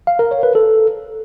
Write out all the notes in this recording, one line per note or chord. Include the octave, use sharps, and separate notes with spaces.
F5
A#4
C#5
B4
A4